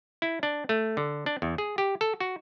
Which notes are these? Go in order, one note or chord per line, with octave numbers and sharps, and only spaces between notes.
E4
D4
A3
D3
D4
E2
G#4
G4
A4
F#4